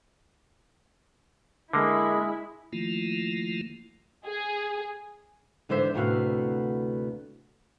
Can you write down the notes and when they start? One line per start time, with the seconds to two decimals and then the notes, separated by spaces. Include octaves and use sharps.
1.73 D3 G#3 A#3 E4
2.73 D#3 F3 A3 A#3 E4 F4
4.26 G#4
5.69 G#2 D3 E3 C5 E5
5.94 D2 A2 C3 B3 F#4 F5